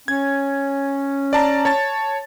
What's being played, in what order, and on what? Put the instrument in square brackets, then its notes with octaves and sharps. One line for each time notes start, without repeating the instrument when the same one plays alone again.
[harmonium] C#4 [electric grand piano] G#6
[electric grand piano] D5 A5 A#5
C#5 A5 A6